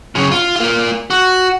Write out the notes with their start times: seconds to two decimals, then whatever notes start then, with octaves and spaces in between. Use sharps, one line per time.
0.15 F#2 C#3
0.32 F4
0.56 A#3 F4
1.10 F#4